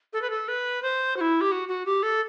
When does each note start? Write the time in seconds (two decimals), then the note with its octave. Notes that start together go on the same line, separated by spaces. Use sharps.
0.13 A4
0.22 B4
0.30 A4
0.48 B4
0.82 C5
1.17 F#4
1.21 E4
1.41 G4
1.52 F#4
1.68 F#4
1.86 G4
2.03 A4